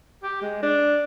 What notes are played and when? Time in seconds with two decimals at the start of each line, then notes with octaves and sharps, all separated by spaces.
0.23 G4
0.42 G#3
0.63 D4